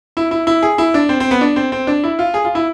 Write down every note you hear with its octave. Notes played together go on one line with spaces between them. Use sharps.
E4
E4
E4
G#4
E4
D4
C4
C4
B3
D4
C4
C4
D4
E4
F4
G#4
F4
E4